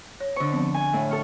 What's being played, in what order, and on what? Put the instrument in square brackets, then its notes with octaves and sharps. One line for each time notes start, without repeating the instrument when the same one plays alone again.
[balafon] C#5
[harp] D3 C#6 [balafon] C5
[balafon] F3 B3 C4
[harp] G#5
A2
A4 C#6 F6